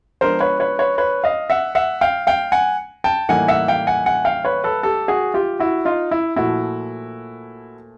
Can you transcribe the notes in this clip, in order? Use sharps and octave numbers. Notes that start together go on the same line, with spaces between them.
F3 G#3 B3 D4 A#4 C5
B4 C#5
B4 C#5
B4 C#5
B4 C#5
D#5 F5
E5 F#5
E5 F#5
F5 G5
F5 G5
F#5 G#5
G5 A5
A2 E3 G3 A#3 D#4 F#5 G#5
E5 F#5
F5 G5
F#5 G#5
F#5 G#5
F5 G5
B4 C#5
A4 B4
G4 A4
F#4 G#4
F4 G4
E4 F#4
D#4 F4
E4
A#2 F3 A3 E4 F#4